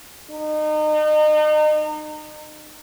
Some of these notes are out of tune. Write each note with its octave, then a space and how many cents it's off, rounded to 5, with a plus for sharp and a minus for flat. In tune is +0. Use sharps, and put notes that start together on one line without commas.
D#4 -35